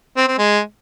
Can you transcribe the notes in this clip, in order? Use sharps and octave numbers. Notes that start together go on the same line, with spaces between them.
C4
C4
G#3